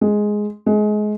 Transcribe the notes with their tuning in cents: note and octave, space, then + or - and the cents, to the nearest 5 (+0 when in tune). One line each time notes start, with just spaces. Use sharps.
G#3 +5
G#3 +25